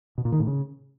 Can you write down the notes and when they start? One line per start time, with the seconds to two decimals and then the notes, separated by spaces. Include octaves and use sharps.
0.18 B2
0.25 A#2
0.32 D#3
0.40 A2
0.47 C#3